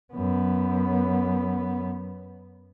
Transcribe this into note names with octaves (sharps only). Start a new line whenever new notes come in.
F#2 B3